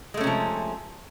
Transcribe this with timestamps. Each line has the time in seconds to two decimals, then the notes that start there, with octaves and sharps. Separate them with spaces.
0.14 G#3
0.17 A3
0.21 C#4
0.24 C3
0.27 F3